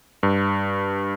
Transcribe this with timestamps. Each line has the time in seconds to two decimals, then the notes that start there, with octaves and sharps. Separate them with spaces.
0.23 G2